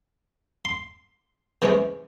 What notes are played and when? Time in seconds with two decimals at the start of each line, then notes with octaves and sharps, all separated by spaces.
0.65 C6
1.62 C3 E3 G#3 C#4